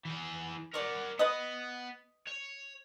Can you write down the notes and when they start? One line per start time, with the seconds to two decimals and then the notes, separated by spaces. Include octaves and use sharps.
0.05 E3 G#4
0.74 A#4 C#5 D5 F#5
1.19 B3 B4 D#5
2.27 C#5